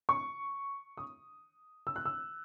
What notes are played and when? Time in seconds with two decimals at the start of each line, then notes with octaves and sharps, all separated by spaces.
0.09 C#6
0.97 D#6
1.87 E6
1.96 F#6
2.05 E6